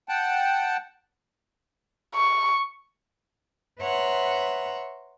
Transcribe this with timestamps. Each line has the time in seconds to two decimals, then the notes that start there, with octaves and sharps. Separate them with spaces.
0.09 F#5 G5 A5
2.15 C#6
3.81 B4 C#5 E5 F#5 A#5 C6